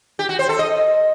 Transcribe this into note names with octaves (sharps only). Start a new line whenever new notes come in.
G4
F#4
C5
A4
D#5